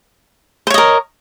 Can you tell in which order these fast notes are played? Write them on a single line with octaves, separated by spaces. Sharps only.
C5 C#5 D#5 A#4